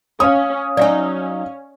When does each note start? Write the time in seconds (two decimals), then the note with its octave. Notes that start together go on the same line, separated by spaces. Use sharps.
0.20 C#4 C#5 F5 D#6
0.77 F#3 C#4 D#4 D5 E5 G#5